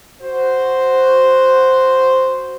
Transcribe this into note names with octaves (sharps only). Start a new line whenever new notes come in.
F#4 C5